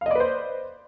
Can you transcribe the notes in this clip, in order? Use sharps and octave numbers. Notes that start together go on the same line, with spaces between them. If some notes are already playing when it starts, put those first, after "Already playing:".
B4 C5 D5 D#5 F5